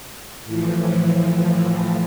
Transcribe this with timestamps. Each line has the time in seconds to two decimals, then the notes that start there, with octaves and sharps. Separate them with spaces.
0.45 A2 E3 F3